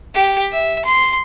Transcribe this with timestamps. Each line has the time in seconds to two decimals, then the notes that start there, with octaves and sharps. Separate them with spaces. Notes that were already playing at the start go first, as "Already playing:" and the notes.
0.15 G4
0.52 E5
0.85 C6